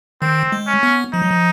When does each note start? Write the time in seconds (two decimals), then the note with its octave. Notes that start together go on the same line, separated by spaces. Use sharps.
0.22 D#3 C4
0.52 G#3
0.67 C#4
0.83 B3
1.14 F3 D#4
1.22 F#3
1.31 F3